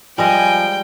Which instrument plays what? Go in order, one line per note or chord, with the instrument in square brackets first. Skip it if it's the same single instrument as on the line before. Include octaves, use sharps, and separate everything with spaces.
[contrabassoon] F3 [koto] G3 G#3 D#5 [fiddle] G5 [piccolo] G#5